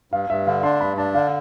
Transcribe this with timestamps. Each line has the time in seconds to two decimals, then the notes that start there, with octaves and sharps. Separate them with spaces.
0.12 G2 F5
0.30 G2 E5
0.47 D3 F5
0.63 D4 C6
0.81 G2 B5
0.97 D4 A5
1.15 D3 F5